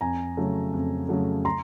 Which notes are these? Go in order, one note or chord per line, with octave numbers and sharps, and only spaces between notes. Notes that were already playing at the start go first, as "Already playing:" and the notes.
F2 G#5 A#5
C#3 F#3 A3
F2
C#3 F#3 A3
A#5 C6